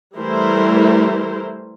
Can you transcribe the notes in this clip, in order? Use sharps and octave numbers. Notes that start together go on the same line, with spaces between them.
E3 G3 A3 E4 A#4 C5